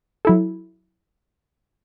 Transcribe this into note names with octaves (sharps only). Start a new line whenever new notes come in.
F#3 E4 A4